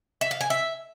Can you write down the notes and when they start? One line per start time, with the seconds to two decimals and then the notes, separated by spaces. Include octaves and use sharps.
0.21 E5
0.31 F5
0.41 G#5
0.50 E5